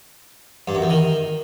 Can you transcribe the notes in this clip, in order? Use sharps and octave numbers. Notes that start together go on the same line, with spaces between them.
G2
F#2
E2
D#3